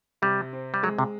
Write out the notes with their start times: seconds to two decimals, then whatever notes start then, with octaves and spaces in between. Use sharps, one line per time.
0.22 C3 G3
0.53 C4
0.74 G3
0.83 F#3 G#3
0.98 C3